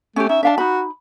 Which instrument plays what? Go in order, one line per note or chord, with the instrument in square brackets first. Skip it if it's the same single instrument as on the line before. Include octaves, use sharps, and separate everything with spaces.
[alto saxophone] A3 [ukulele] C#4 G4
[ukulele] C#4 D#4 [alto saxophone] E5
[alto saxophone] D4 [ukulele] E5 F5 A5
[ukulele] D#4 B5 [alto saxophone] F#4